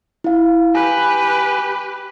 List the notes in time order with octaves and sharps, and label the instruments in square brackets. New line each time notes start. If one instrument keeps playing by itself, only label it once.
[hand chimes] E4 F5
[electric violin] G4 B4 [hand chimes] G#5